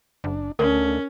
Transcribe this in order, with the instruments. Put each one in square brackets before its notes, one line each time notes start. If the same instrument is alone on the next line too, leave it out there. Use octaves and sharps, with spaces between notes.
[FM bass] F#1 [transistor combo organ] D4
[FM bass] D2 [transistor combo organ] D3 A3 [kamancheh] C#4 [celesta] A#4